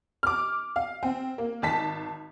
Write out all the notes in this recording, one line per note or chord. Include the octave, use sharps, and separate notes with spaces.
D6 F6
F5
C4
A#3
G#1 A5 B6